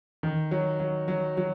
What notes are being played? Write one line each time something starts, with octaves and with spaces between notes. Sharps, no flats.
D#3
F#3
F#3
F#3
F#3